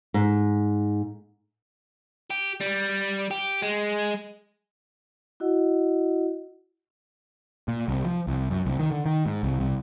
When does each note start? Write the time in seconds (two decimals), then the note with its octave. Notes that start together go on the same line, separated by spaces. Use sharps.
0.14 G#2
2.30 G4
2.61 G3
3.31 G4
3.62 G#3
5.40 E4 F#4 D#5 F#5
7.68 A#2
7.88 C2
8.05 F3
8.27 C2
8.50 F#2
8.65 C2
8.79 D#3
8.92 D3
9.06 D#3
9.26 G#2
9.43 C2
9.60 C2